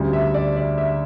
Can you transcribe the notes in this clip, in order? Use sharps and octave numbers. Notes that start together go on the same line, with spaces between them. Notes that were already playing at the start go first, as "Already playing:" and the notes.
Already playing: D2 C#3 G3
E5
D5
D5
E5